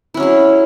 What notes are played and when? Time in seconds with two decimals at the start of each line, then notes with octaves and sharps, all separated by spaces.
0.14 E4
0.17 C#4
0.20 F#3
0.23 G#4